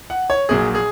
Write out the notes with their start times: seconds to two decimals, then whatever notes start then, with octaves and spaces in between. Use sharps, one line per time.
0.10 F#5
0.30 C#5
0.49 A#1 A#2 F#3 G#4
0.75 G#4